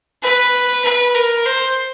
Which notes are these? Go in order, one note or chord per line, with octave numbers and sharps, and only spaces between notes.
B4
B4
A#4
C5